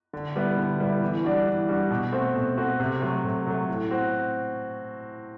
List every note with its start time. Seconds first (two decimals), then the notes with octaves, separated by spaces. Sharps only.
0.13 D3
0.36 G3 B3 E4
0.58 D3
0.80 G3 B3 E4
1.02 E3
1.25 G3 D4 F#4
1.47 E3
1.69 G3 D4 F#4
1.90 B2
2.12 A3 C4 F#4
2.36 B2
2.58 A3 C4 F#4
2.80 C3
3.02 F#3 A3
3.24 C3
3.47 F#3 A3
3.69 A2
3.90 C4 F#4